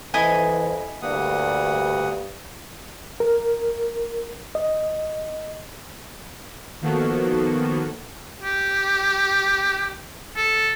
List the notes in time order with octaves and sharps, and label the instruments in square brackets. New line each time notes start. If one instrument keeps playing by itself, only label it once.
[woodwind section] F2 [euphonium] E3 [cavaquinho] E4 D#5 G#5
[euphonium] D2 [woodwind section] G2 [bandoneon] A#3 F#5 D#6
[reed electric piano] A#4
D#5
[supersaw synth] D#3 F3 A#3 B3 F#4 A4
[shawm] G4
A4